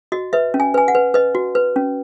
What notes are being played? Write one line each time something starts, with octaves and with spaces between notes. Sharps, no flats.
F#4 D#5
B4 E5
C#4
G#5
B4 G#5
F#5
B4
B4 D#5
F#4
B4
C#4